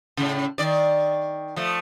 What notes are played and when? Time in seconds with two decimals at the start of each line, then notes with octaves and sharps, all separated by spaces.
0.17 A2 C#3
0.58 D#3 D5
1.56 F3 A3